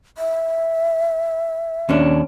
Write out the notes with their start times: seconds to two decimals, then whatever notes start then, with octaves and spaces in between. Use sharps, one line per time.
0.18 E5
1.89 D#2 C#4 D4